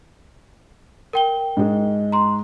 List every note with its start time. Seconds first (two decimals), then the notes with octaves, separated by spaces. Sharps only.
1.13 A#4 G5 G7
1.57 G#2 G#3
2.12 A#5 C6